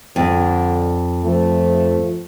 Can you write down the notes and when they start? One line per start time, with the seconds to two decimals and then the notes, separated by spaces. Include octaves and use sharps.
0.16 F2 D3
1.23 F3 A3